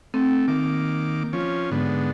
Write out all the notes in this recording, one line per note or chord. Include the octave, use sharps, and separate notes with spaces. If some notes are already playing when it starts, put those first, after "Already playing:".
A3 C4
D#3 A#3 D6
F3 C#4
G#2 D3 B3